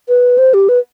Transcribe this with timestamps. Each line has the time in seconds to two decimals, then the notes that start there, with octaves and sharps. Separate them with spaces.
0.08 B4
0.38 C5
0.54 G4
0.69 B4